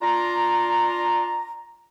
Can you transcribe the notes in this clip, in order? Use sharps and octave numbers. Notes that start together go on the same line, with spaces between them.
D4 F4 A#5